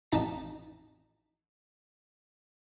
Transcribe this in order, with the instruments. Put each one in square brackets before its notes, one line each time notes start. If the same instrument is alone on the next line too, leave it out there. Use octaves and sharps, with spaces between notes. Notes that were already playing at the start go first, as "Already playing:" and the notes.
[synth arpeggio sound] A1 F2 D#4 A5 B6